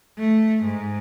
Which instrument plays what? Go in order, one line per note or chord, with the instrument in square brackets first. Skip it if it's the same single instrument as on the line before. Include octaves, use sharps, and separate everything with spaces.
[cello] A3
G#2